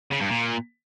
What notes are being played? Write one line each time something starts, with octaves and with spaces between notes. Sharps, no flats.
C#3
G2
A#2